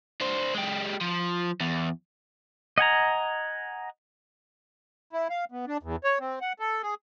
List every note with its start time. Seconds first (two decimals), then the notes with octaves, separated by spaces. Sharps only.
0.21 D4 C5
0.54 G#3 G4
1.01 F3
1.60 E2
2.78 D#5 F#5 G#5 A#5
5.13 E4
5.30 F5
5.52 B3
5.68 D4
5.83 E2
6.04 C#5
6.20 C4
6.41 F#5
6.59 A4
6.83 G#4